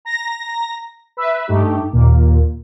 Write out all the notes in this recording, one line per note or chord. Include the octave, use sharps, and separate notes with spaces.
A#5 A#6
B4 E5
G2 A3 D#4 G4
D#2 A#2 A#3